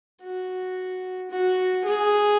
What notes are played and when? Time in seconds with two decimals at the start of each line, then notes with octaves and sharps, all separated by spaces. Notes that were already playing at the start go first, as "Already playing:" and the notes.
0.23 F#4
1.31 F#4
1.85 G#4